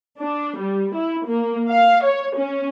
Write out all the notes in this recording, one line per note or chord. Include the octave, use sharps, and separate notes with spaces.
D4
G3
E4
A#3
F5
C#5
C#4